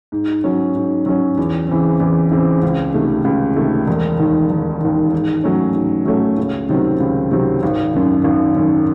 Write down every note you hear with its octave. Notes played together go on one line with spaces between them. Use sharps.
G#2
F#3 C#4
G#2
F#3 C#4
E2
C#3 E3 C4
E2
C#3 E3 C4
C#2
C3 D#3 A3
C#2
C3 D#3 A3
E1
D#2 D#3
E1
D#2 D#3
G#2
F#3 A3 C#4
G#2
F#3 A3 C#4
C#2
C3 D#3 F#3 C4
C#2
C3 D#3 F#3 C4
G#1
F#2 D#3
G#1
F#2 D#3